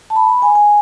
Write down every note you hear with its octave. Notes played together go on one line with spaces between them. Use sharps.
A5
B5
B5
G#5
G#5